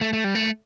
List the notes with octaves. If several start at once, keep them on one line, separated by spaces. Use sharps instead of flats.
A3
A3
G3
A3